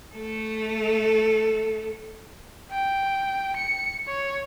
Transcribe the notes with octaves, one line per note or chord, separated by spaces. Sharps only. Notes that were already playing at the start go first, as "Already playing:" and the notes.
A3 A4
G5
C#7
C#5